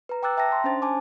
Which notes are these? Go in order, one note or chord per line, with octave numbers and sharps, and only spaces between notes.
B4 A#5
G5 A#5 D6 E6 F#6 A6
E5 G5 A5 A#5 A#6
C6
C#4 D4 C5 A6
G#5 A5 D6